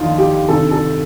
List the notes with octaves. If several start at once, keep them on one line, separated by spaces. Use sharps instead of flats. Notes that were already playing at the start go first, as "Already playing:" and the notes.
Already playing: D#2 D3 F3 D#4 F4
G4
D2 C3 D#3 A4
A4